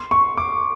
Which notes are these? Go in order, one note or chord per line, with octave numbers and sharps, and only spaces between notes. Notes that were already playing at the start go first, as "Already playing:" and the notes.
Already playing: C6
C#6
D6